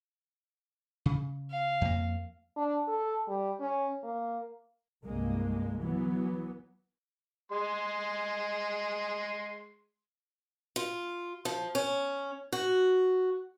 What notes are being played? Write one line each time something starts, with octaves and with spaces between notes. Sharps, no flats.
C#3
F5
F2 A#3
D4
A4
G3
C#4
A#3
C2 G2 G#3 A#3
E3 F#3 B3
G#3 C6
F4
F3
C#4
F#4